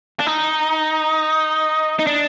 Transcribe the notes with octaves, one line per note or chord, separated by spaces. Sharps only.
D4
D#4
D#4
D4